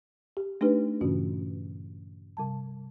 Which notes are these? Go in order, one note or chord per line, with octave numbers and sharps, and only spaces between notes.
G4
A3 D4 D#4 G4 B4
G2 A#2 C#3 E3 C#4 F#4
C3 G3 A5